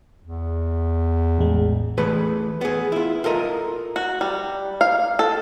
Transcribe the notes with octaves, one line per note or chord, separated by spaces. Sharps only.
E2
A1 G#3
E3 A3 G#4 B4 B5
B3 G#4
E4 F4
F4 A4 A#4 D#5
F#4
G3
F5
A4